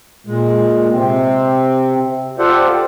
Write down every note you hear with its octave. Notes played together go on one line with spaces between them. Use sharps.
A#2 G#3
C3 C4
F4 G4 A4 C5 D5 F#5